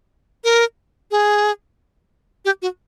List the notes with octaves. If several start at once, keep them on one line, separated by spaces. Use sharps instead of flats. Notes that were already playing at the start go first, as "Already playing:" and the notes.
A#4
G#4
G4
F#4